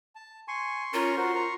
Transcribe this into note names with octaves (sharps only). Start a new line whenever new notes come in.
A5
G#5 C6 C#6
C#4 F4 A#4 A#5
F#4 A#4 C5
A#5